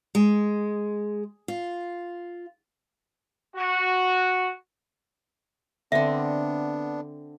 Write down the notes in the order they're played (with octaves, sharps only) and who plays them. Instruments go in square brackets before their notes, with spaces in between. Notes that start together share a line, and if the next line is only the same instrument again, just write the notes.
[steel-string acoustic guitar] G#3
F4
[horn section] F#4
[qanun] D3 C4 [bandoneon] B3 D4 [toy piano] E5